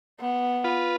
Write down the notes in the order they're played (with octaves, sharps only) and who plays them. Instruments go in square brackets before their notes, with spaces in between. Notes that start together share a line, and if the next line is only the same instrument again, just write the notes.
[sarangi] B3
[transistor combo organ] F4 B4